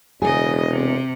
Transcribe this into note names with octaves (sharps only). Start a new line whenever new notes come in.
E1 C#3 G#4 D#5
C3